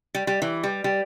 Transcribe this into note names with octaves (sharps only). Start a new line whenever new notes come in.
G3
G3
E3
G3
G3